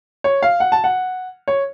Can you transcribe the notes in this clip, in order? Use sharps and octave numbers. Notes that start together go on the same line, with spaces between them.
C#5
F5
F#5
A5
F#5
C#5